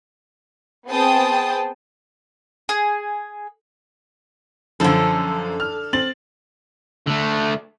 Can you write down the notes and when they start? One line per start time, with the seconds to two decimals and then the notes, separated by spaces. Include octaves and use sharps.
0.89 B3 C4 G#4 G5 A5 D#6
2.69 G#4
4.80 F#2 D3 F3 A4
5.60 F6
5.93 C4 A6 F#7
7.07 D3 A3